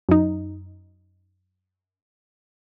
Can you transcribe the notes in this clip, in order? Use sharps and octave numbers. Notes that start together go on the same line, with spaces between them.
F#2 D#4